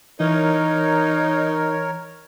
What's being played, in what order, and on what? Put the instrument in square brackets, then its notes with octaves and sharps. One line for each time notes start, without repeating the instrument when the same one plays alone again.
[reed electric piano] E3 [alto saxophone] D#4 [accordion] A#4 C#5